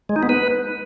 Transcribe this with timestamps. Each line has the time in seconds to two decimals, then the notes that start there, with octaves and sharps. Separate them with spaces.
0.09 G#3
0.16 D#4
0.23 B3
0.29 B4